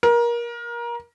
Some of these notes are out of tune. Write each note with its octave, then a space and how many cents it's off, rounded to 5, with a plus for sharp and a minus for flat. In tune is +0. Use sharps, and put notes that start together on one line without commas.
A#4 +25